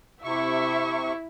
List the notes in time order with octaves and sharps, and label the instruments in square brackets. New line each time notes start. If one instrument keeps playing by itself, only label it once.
[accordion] C3 C#6 [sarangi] E4 [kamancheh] E5